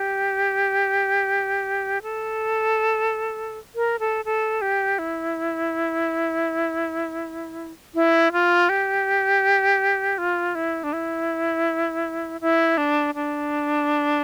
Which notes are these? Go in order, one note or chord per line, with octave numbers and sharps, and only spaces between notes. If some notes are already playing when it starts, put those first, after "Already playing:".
Already playing: G4
A4
A#4
A4
A4
G4
E4
E4
F4
G4
F4
E4
D4
E4
E4
D4
D4